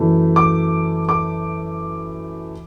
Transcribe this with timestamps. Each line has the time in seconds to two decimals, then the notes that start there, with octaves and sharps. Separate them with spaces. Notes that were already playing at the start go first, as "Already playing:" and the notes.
Already playing: F#2 E3 A3
0.36 D6
1.09 D6